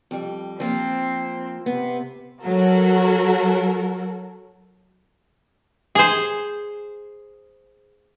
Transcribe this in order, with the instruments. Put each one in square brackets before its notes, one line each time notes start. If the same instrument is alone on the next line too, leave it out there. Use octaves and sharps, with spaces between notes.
[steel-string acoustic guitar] F2 G3
[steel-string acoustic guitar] F3 A#3 [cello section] C4
[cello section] C3 [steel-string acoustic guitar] B3
[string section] F#3 F#4 A4 A#4
[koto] G#4 C5